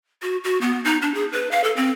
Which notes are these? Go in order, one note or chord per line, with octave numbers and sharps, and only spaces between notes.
F#4
F#4
B3
D#4
D4
G#4
B4
F5
A4
C4